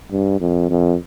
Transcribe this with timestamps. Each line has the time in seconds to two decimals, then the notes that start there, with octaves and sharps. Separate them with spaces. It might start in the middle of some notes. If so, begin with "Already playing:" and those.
0.11 G2
0.40 F2
0.70 F2